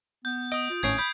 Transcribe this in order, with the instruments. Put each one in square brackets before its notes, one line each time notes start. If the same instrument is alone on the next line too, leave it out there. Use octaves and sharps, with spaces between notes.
[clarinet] B3 [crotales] G6
[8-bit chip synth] D#5 [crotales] D#6 D7
[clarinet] F4
[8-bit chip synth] G#1 A2 C#5 [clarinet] C#4 [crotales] G#6 C7 D7
[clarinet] B5 [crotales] G6